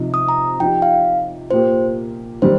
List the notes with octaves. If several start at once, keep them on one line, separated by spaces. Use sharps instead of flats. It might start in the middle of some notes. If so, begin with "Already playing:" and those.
Already playing: C3 F3 D#4
D#6
A#5
F3 D#4 G4 G5
F5
A#2 A#3 G4 C5
D#3 G3 C5